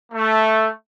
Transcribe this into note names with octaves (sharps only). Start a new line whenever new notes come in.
A3